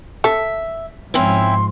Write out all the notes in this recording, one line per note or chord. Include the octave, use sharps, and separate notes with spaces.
A4 E5
G#2 F3 C4 C#4 E4 C6